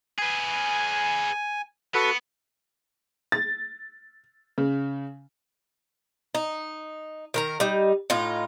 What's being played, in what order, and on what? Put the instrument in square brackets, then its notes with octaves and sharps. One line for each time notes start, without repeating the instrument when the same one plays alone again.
[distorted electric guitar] G#4 B4 [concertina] G#5
[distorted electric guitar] B3 [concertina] F#4 A4 B4
[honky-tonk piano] A6
C#3
[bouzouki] D#4
D#3 A#4 A#5
G3 D#4
A2 D#4 F4